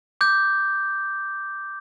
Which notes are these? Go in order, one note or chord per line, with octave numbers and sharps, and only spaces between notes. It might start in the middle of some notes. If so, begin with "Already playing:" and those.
D6 G6